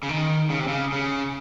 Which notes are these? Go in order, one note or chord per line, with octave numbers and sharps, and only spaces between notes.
C#3
D#3
C#3
C3
C#3
C#3